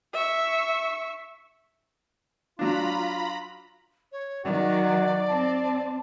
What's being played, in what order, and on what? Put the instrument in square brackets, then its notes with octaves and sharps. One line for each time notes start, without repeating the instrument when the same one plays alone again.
[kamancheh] E5 C#6
[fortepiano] F#3 D4 [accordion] F4 [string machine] A#5 B5
[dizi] C#5
[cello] D#3 F#3 [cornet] F#4 [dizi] D5
[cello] C4 [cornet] A5